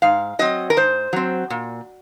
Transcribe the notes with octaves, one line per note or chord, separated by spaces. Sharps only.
G#2 F5
F#3 C4 D#5
A#4
G#2 C5
F#3 C4
A#2